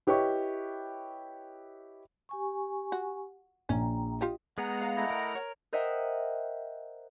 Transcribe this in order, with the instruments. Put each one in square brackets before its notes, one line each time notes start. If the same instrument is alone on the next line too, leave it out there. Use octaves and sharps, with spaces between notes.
[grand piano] E4 G4 B4 C#5 D#5 C#6
[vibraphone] G4 G#5 C#6
[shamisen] F#4
[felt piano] A#1 [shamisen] C#4 [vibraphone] G5 A#5
[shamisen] F4 G4 D#5
[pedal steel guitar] G#3 B3 G#4 [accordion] F#5 A#5
[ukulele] B4 F5
[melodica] A3 E4 D#5
[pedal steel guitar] A#4
[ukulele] C#5
[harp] A#4 C5 D#5 E5 F#5 G5